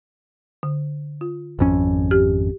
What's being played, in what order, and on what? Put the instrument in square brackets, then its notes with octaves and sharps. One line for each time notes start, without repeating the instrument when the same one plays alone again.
[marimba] D3
F4
[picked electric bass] G#1 F2 C#4
[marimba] G4